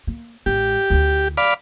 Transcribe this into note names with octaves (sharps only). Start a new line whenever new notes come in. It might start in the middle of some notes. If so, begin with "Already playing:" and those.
A#3
A1 G#3 G4
D2 E4
D5 F5 B5